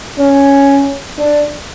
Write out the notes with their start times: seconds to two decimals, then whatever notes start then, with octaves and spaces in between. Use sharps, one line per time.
0.19 C#4
1.18 D4